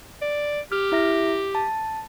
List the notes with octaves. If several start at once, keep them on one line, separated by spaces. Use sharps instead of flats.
D5
G4 F6
E4 E5 A#6
A5